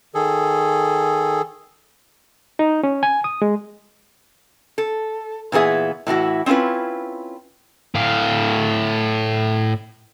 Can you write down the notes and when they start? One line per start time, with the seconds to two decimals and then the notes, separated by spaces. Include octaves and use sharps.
0.15 D#3 G#4 A4
2.59 D#4
2.84 C#4
3.03 G#5
3.24 D#6
3.42 G#3
4.78 A4
5.52 A#2 E3 B3 G#4 E5
6.07 A2 E3 E4 F#4
6.46 C4 C#4 E4 F4 B4
7.95 A2 F5